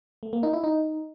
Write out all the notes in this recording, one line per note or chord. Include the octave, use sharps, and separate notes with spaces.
A3
A#3
D#4
E4
D#4